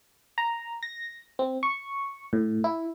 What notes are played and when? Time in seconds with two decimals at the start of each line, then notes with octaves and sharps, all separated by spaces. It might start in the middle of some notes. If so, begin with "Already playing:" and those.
0.38 A#5
0.83 A#6
1.39 C4
1.63 C#6
2.33 A2
2.64 E4